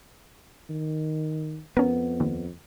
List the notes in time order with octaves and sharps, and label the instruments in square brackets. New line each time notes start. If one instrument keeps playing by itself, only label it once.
[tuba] D#3
[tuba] F2 [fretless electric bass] B3 [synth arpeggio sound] C#4 A#4
[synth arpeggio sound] D#2